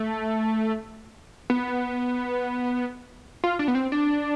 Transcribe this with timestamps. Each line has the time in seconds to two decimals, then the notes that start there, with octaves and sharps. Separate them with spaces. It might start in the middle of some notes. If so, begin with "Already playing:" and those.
Already playing: A3
1.50 B3
3.44 F4
3.59 D4
3.68 B3
3.75 C4
3.92 D4